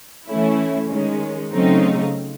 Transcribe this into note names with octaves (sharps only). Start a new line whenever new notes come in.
E3 A3 C#4 E4
D#3 G#3 C#4
C#3 F#3 A3 C4 D#4